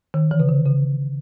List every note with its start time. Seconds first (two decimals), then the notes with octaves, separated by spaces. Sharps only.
0.14 D#3
0.31 E3
0.40 C#3
0.49 D3
0.65 C#3